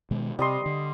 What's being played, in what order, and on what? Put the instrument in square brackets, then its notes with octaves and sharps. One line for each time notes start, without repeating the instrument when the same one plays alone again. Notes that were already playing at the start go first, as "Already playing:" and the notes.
[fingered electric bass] B2 D#3 G#3
[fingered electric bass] C3 [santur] G3 D#5 C6
[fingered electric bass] D3